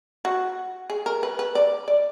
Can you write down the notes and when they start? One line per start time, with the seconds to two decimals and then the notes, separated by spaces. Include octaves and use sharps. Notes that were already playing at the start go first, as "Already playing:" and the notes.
0.25 F#4
0.90 G#4
1.06 A#4
1.23 B4
1.39 B4
1.55 D5
1.88 D5